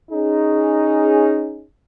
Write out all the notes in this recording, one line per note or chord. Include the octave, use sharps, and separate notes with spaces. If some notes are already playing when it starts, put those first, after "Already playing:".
C#4 D#4 G#4